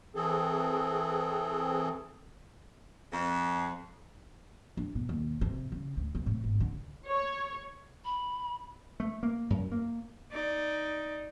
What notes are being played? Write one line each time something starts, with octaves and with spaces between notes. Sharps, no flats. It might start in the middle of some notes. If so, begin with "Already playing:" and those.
E3 C4 G#4 A4
F2
D4
B2
D#2
C3
C#3
D2
C3
A2
G#1
D3
C#5
B5
A3
A#3
F#2
A#3
D#4 D5